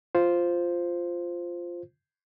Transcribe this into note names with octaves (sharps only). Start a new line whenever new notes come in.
F4 C5